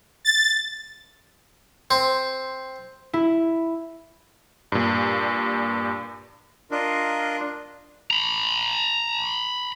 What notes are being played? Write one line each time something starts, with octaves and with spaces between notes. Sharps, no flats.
A6
C4
E4
G2 A#2
D4 F4 A#4 D#5
A#5 B5